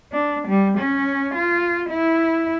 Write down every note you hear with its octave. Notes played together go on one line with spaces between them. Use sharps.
D4
G3
C#4
F4
E4